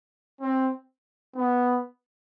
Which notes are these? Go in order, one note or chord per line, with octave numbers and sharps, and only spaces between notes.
C4
B3